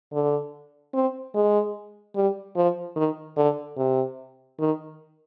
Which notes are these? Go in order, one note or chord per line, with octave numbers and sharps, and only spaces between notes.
D3
C4
G#3
G3
F3
D#3
D3
C3
D#3